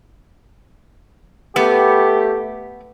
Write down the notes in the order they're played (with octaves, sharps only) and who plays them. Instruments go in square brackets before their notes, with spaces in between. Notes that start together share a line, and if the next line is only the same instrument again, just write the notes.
[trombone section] A3 G4 [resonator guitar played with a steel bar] B3